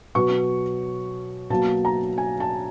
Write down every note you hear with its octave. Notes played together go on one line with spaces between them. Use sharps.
B2 F#3 B3 C#6
B2 F#3 A#3 A5
A#5
G#5
A5